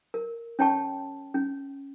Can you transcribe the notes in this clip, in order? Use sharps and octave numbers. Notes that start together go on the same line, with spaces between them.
A#4
C#4 C#5 G5 A5 C#6
C#4